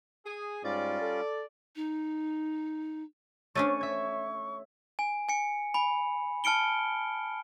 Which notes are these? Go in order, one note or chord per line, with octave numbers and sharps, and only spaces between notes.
G#4
G#2 G3 C#4 F4 D5
A4
D#4
A3 C#4 D4 C#5 C#6 A6 D#7
E5 G#6
G#5
G#5 C#7
G#5 B5
A5 F6 C#7 D7 G7